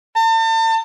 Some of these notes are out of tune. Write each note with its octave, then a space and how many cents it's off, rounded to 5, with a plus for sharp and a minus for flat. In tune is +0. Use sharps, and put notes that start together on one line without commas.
A5 +40